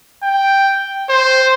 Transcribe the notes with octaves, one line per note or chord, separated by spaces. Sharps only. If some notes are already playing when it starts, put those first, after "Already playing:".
G5
C5